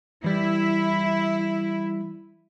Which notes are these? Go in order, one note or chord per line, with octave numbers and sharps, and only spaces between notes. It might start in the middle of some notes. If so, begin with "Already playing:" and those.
E3 G3 E4